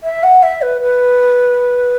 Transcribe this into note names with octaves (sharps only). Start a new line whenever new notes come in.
E5
F#5
E5
B4
B4